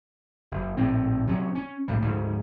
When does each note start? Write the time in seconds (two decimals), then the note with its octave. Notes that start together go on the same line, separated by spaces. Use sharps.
0.51 F#1
0.77 A#1 A2 C4
1.27 C3 F#3 C#4
1.55 C#4
1.88 B1 A2 G3
2.02 D2 G#2 C#3